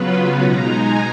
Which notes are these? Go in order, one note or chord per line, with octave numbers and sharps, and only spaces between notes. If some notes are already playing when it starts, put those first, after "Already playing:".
Already playing: C#3 F#3 B3 F4 B4
B4
B2 G#3 D#4 A#5
G#5